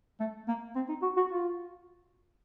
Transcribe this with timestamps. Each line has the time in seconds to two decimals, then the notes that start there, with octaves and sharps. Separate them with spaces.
0.20 A3
0.48 A#3
0.76 C4
0.89 D#4
1.02 F#4
1.17 F#4
1.31 F4